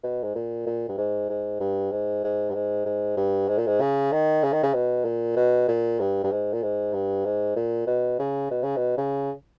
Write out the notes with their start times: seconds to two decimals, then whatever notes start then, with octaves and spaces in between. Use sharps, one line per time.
0.04 B2
0.23 G#2
0.36 A#2
0.67 A#2
0.89 G2
0.98 G#2
1.30 G#2
1.60 G2
1.92 G#2
2.24 G#2
2.50 G2
2.55 G#2
2.86 G#2
3.17 G2
3.48 G#2
3.58 A#2
3.67 G#2
3.81 C#3
4.12 D#3
4.43 C#3
4.52 D#3
4.63 C#3
4.74 B2
5.05 A#2
5.36 B2
5.68 A#2
6.00 G2
6.24 G2
6.31 G#2
6.53 A#2
6.63 G#2
6.93 G2
7.25 G#2
7.56 A#2
7.87 B2
8.19 C#3
8.51 B2
8.63 C#3
8.77 B2
8.98 C#3